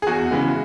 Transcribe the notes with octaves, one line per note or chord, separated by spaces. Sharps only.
G#4
E2 F#4
C#3 E3 G#3